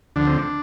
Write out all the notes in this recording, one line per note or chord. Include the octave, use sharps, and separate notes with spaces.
D2 D3 F3 D4
C4
D4